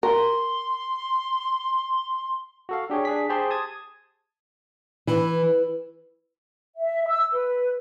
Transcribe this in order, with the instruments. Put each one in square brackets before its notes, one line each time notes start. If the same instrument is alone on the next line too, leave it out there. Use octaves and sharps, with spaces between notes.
[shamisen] A#4 [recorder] C6
[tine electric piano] F#4 A4 F5
D4 G4 G#4 C#5
D4 G#4 B6
G4 G#4 C5 A5 C6
A5 D#6 G#6
[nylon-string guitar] E3
[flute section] E5
E6
B4